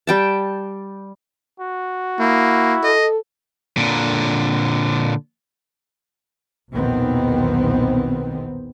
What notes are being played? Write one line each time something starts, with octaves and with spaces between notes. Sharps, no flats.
G3 G5 A5
F#4
A#3 E4
A4 D#5
A#2 D3
B1 E2 A#2 D#3 B3 C4